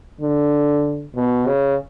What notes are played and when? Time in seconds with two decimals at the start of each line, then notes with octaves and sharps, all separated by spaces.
0.21 D3
1.16 B2
1.47 C#3